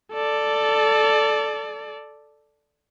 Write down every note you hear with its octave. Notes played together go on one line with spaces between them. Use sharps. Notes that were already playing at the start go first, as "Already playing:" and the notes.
A4 D5